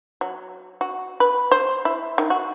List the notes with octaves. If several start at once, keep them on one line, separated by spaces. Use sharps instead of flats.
F#3
F#4
B4
C5
E4
D#3
F#4